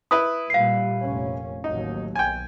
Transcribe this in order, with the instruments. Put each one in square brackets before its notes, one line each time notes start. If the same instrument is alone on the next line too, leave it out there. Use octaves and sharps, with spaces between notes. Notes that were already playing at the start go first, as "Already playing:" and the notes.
[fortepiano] E4 B4 [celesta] D#6
[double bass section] A#2 G3 [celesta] F5 C7
[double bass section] F1 A#2 C#4
[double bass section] A1 D#2 F#3 [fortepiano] D#4
[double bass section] B1 [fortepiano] G5 G#5